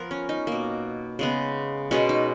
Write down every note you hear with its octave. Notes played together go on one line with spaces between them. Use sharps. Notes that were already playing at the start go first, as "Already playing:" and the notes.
Already playing: F3 B3 A#4
C#4
D#4
B2 A#3
C#3 G#3 B3
B2 G#3 B3 C#4
D#4